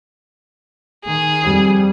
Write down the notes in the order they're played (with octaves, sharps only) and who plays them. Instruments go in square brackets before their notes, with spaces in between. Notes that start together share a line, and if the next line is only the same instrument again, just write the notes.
[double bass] D#3 [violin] G#4
[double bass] F2 G3